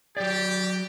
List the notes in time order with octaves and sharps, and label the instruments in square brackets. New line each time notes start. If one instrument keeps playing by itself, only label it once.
[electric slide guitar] F#3 D5 [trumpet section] G4